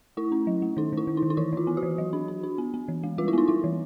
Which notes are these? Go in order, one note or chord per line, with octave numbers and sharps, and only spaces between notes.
A3 E4
C#4
F#3
A3
D#3 D#4
D#3 E4
D#3
D#4
D#3
D#4
E3 E4
E3 F4
B3
F#4
E3
F#3
D4
D4
D4
B3
B3
E3
G#3
G3 F4
E4
B3 D#4
G3 E4
E3